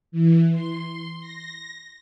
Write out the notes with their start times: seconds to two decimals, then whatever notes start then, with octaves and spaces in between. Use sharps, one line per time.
0.12 E3
0.52 C6
1.21 A#6